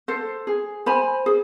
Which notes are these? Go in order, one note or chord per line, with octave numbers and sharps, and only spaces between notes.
A4 C5
G#4
C5 G#5 B5
G#4